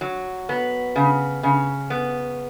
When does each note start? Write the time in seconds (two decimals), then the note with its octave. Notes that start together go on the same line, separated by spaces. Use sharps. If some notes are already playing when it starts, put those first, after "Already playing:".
0.01 F#3
0.49 B3
0.96 C#3
1.43 C#3
1.90 B3